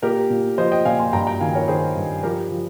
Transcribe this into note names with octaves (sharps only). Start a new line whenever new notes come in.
A#2 G4 A#4
A#2
F3 C5 D#5
D#5 G5
A#2 F5 G#5
G#5 C6
G2 G5 A#5
G5 A#5
D#3 F5 G#5
A#4 C#5
D#3 G#4 C5
G2
F3 G4 A#4
F3